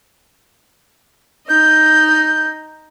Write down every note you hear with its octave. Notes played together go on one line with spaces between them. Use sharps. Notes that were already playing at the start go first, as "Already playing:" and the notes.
D#4 D#5 G6